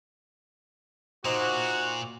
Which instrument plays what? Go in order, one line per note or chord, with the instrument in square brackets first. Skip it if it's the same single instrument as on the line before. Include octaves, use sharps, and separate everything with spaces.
[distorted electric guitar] A#2 [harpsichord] D#4 C5 [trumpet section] F#4